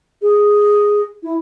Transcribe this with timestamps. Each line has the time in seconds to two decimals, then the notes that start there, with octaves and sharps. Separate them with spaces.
0.22 G#4
1.23 E4